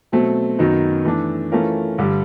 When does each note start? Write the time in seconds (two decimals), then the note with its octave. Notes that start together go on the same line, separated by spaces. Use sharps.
0.12 B2 F#3 A3 C4
0.59 F#2 D#3 F#3 B3 D#4
1.05 E3 A3 D4
1.52 E3 A3 C#4 F4 A#4
1.98 G2 D3 G3